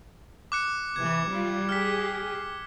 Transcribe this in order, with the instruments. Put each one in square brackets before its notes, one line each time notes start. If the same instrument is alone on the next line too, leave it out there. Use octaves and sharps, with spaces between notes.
[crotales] D6 F#6 C#7
[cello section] C3 E3 [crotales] G#6
[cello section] G3 F4
[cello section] G4 G#4 [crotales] F6 B6